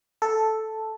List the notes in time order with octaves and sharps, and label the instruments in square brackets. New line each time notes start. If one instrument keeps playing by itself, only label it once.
[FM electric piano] A4